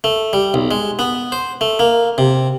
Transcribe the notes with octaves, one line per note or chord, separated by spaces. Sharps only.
A3
G3
B1
G#3
B3
C5
A3
A#3
C3